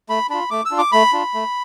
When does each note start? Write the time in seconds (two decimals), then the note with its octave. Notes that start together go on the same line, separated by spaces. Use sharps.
0.09 A3 B5
0.30 D4 F4 B5
0.51 A3 D6
0.65 E6
0.71 D4 F4
0.78 D6
0.92 A3 B5
1.13 D4 F4
1.34 A3